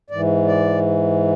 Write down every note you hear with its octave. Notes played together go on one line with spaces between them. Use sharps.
G#2 E3 D5
D5